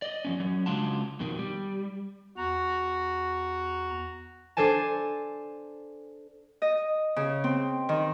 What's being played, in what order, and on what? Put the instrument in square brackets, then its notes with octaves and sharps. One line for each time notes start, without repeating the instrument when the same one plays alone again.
[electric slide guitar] D5 D#5
F3 A3 C#4
F#3 C#4
C#3 G#3 D4 F4 F#4 A5
F2 B2 D#3
G3
[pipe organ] E2 A#5 [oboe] F#4
[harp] D4 A4 C5 G#5 A5
D#5
C#3
C4
D#3